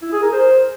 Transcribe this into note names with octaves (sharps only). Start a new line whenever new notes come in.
E4
G#4
A#4
C5